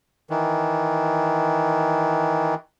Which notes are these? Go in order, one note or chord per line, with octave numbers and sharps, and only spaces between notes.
D#3 E3